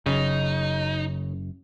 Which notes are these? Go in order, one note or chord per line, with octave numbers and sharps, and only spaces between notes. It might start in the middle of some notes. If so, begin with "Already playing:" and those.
F#1 F#2 C#3 D#4